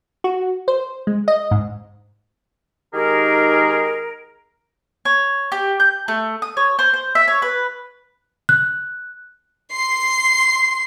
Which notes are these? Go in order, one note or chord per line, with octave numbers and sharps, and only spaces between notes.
F#4
C5
G#3
D#5
G#2
D#3 G#3 D#4 G4 G#4 A#4
C#5
G4
G6
A3
D#6
C#5
C5
C5
E5
C#5
B4
F#6
C6 C7